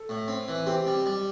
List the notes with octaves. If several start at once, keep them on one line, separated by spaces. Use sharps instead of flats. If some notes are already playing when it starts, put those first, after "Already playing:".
Already playing: A4
A2
C4
E3
C4 G4
G3
G3